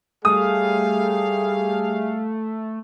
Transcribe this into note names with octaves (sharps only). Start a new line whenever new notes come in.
G3 A3 G#4 F5 D#6